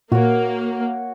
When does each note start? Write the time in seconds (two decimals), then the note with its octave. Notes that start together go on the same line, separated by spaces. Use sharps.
0.12 A#2 A#3 F#4 C#5